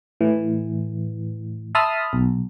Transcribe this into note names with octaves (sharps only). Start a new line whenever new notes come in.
A2 E3
E5 A5 B5 C6 D#6 F6
B1